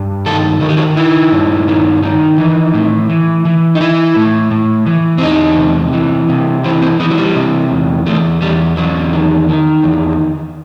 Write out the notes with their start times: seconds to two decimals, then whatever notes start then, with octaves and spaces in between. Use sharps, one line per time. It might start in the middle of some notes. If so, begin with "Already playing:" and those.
Already playing: G2
0.26 D#3 A4
0.61 D#3 F#4
0.69 G4
0.77 F#4
0.96 D#3 E4
1.32 G2
1.68 D#3
2.03 D#3
2.38 E3
2.74 A2
3.10 E3
3.45 E3
3.75 D#4
3.80 E3 E4
4.16 A2
4.51 A2
4.86 E3
5.18 C4
5.22 E2 D#4
5.58 C3
5.93 E3
6.29 C3
6.64 E3 C4
6.82 C4
7.00 E3 B3
7.10 F#3
7.18 G3
7.36 C3
7.71 E2
8.06 E2 A3
8.42 E2 G3
8.77 E2 F#3
9.12 D#3
9.49 D#3
9.83 E2